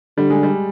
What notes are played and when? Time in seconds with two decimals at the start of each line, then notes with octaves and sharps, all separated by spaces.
0.17 D3 G3
0.30 G#3
0.43 G3